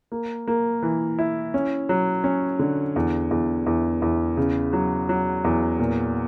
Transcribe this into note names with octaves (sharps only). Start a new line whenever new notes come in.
A#3
A#3
E3
E4
C#4
F#3
C#4
D3
E2
E2
E2
E2
C#3
F#3
F#3
E2
A#2